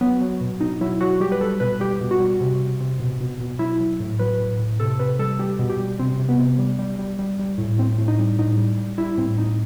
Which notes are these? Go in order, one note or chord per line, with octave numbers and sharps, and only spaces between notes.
F#3 B3
F#3
B2
B2 D#4
F#3 E4
F#3 F#4
G3 G4
B4
G3 A4
B2 B4
G3 G4
B2
F#4
G3
C3
C3
C3
B2
B2
B2
F#3 E4
F#3
A2
F#3 B4
A2
A2
C3 A4
C3 B4
G3 A4
G3 G4
B2
G4
G3
C3 C4
C3
B3
C3
G3
G3
G3
G3
G3
A2
A2 C4
A2
D#4
G3
A2 D#4
G3
G3
G3 E4
A2 C4
A2 D#4